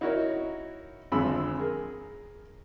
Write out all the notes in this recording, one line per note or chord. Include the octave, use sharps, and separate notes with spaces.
D#4 E4 F#4 A#4 C#5
G#1 F2 D3 G#4 B5 E6
G#4 A#4